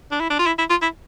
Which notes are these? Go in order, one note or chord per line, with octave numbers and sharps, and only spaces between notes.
D4
E4
D4
F4
E4
E4
F4
E4